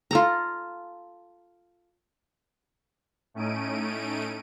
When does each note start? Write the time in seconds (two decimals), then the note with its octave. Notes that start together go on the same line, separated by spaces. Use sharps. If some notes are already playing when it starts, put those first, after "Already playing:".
0.11 F4 A4 A#5
3.34 A2 A3 C#4 D#4 D7 D#7